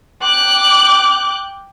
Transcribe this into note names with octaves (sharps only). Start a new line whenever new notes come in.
G5 D6 F#6